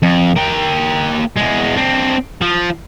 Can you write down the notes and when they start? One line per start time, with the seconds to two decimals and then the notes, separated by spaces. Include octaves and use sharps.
0.03 F2
0.37 A#3 G5
1.37 E2 G#3
1.77 C4 D4
2.42 F3